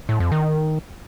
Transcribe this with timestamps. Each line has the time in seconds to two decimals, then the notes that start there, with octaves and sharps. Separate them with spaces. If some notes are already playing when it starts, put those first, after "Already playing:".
0.09 A2
0.20 F2
0.32 D#3